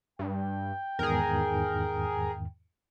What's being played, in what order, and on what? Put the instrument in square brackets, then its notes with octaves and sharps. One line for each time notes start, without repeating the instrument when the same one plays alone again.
[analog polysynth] G2 [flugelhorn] G5
[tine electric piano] E2 G#2 D#3 [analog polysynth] G#4 A#4